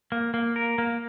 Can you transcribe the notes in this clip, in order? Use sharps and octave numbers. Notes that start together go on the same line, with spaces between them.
A#3
A#3
A#4
A#3